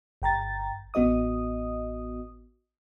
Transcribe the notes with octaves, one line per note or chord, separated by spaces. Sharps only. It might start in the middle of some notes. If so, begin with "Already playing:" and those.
G1 G5 A#5 A6
A1 B3 F#4 D#5 D#6